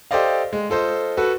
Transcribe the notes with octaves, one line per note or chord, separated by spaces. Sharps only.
G4 A4 C5 D5 D#5 F5
G#3
F4 A4 C5 D#5
F#4 A4 B4